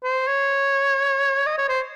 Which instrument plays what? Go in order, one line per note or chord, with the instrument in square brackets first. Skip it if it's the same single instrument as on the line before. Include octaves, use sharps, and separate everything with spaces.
[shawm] C5
C#5
D#5
C#5
C5